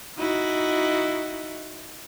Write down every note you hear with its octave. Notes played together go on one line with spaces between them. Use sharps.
D#4 E4 F#4